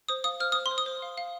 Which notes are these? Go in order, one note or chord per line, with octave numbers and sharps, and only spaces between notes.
C5 D#6
F5 D#6
C5 F6
C5 D#6
C6
C5
D#6
C5
F5
F5